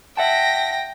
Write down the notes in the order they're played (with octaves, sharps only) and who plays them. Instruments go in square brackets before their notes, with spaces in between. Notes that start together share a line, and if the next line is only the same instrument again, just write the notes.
[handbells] E5 F#5 A5 [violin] G5 A#6